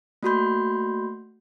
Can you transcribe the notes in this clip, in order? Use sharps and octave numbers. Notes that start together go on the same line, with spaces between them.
A3 A#3 F#4 B5 C6 G6